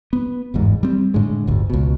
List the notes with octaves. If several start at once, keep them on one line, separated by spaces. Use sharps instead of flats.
B3
G1 E2 G#2
G3 C4
A2 D3 G#3
G1 D2
C#2 B2